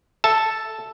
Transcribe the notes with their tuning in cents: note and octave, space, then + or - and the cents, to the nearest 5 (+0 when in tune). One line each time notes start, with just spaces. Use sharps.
A4 +0 E5 +0 A5 +0